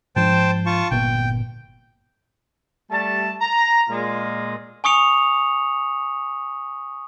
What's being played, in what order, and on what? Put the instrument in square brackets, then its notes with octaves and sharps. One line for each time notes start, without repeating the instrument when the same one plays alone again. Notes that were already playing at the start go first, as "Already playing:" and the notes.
[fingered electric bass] G#2 F3 D4 [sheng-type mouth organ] C5 G5 A5
[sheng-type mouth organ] F4 A5 C#6
[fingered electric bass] G1 A#2 B3 [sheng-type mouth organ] G5
[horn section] G3 A3 A5
A#5
A#2 G#3 F4
[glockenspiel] G#5 C#6 D#6 C#7 F7